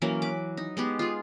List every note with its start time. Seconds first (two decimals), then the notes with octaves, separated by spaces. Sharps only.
0.02 E3 F#3 A#3 C#4
0.22 B4 D6
0.57 D#4
0.77 G#3 B3 G4
0.99 F4 G#4